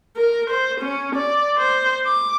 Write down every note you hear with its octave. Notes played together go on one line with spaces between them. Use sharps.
A#4
C5
C#4
D5
C5
D6